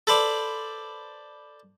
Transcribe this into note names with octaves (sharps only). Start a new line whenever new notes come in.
A4 B4 C5 D5